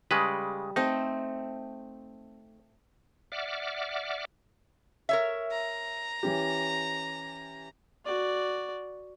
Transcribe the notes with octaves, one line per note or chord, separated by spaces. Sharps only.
C#3 G3 G#3 B4
A3 C4 D#4
D5 E5 F#5 D6 F6
A#4 C#5 E5
A#5
E3 C#4 G4
F#4 D5